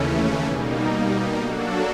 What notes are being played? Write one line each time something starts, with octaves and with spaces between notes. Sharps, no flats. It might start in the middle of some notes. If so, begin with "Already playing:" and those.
Already playing: D#2 C#3 E3 A3 C#4
B2 G3 A#3 D#4
F#3 A#3 D4 F#4 A4